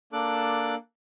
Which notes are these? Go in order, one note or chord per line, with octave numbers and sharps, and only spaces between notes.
A#3 D4 A4 D6 F#6